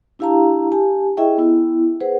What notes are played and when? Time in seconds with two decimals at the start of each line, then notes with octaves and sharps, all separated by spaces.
0.19 D4 E4 G4 F5 A5 A#5
0.72 G4 G#5 A5
1.17 E4 G#4 D#5 E5 G5 C#6
1.38 B3 E4
2.00 G#4 B4 C5 F#5